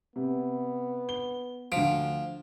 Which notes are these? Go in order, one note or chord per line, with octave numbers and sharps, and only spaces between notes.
C3 B3
G7
D2 F3 D7